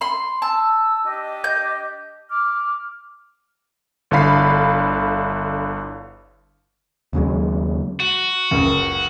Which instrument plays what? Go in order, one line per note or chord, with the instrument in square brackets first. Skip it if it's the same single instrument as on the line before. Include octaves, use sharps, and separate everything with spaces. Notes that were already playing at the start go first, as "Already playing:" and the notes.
[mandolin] B5 C6
[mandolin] A5 [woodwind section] E6
[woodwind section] D4 G4 D#5
[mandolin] G6
[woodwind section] D6 F6
[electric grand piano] G1 D3 E4 F5 B5 C7
[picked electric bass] D#2 C#3 F#3 G#3
[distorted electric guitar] F#4
[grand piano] F#1 C#2